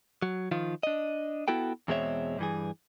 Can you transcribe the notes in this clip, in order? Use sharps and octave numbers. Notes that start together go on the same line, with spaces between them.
F#3
D#3 F3 F4
D4 D#5
B3 E4 F#4 A4 G5
E2 B2 G#3 C4 C#5 E5
G2 E3 G#4